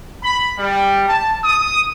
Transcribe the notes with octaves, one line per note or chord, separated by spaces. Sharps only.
B5
G3
A5
D#6